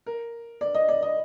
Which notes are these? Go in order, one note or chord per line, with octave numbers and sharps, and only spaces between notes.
A#4
D5
D#5
D5
D#5